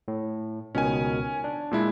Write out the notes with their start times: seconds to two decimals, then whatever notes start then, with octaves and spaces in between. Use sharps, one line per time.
0.08 A2
0.75 C#2 B2 D#3 C#4 G#5
1.44 D4
1.71 A#2 G#3 E4